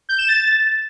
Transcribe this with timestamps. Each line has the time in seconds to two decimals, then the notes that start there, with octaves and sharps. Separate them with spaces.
0.09 G6
0.18 E7
0.28 A6